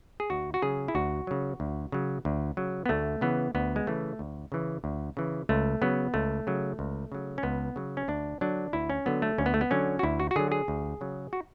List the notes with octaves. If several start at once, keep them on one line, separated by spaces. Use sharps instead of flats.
G#4
D2 F#4
F#4
C#3 F#3 G#4
E4
D2 F#4
C#3 F#3
D2
C#3 F#3
D2
C#3 F#3
B3
D2 A3
C#3 E3 B3
D2 B3
G#3
C#3 E3 A3
D2
C#3 E3
D2
C#3 E3
C#2 A3
C#3 F#3 B3
C#2 A3
C#3 F#3
C#2
C#3 F#3
C#4
C#2 B3
C#3 F#3
C#4
D2 D4
D3 F#3 D4
D2 E4
C#4
D3 F#3 B3
A3
D2 C#4
B3
A3
B3
D3 F#3 C#4
F#4
D2 E4
F#4
F#4
D3 F#3 G#4
G#4
D2
C#3 F#3
F#4